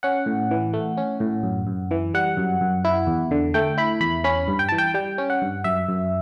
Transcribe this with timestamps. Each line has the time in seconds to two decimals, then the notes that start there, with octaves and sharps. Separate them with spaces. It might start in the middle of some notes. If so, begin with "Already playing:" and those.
0.03 C#4 F#5
0.26 A2
0.51 E3
0.73 A3
0.97 C#4
1.20 A2
1.43 F#2
1.67 F#2
1.91 E3
2.14 G3 F#5
2.37 F#2
2.61 F#2
2.85 E4
3.07 E2
3.31 D3
3.54 A3 G5
3.78 E4 B5
4.01 E2 B5
4.24 C#4 B5
4.48 G2
4.59 G5
4.69 E3 A5
4.78 G5
4.94 G3 G5
5.18 C#4
5.30 F#5
5.42 G2
5.64 F#2 E5
5.89 F#2